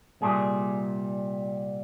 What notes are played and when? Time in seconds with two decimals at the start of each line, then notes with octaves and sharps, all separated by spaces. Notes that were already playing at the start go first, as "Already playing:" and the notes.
0.21 C2 A#2 G3 G#4